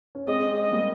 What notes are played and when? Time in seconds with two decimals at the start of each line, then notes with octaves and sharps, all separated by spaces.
0.15 C#4
0.27 G#3 C4 D#5
0.58 D#5
0.72 G3 A#3